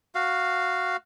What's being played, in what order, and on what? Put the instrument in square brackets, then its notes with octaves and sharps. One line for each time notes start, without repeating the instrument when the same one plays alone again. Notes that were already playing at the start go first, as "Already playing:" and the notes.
[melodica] F#4 F5